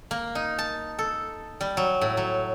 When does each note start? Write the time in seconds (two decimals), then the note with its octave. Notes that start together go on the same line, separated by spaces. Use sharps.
0.11 A#3
0.35 D#4
0.59 A5
0.99 A4
1.61 G3
1.77 F#3
2.01 A2
2.17 F#3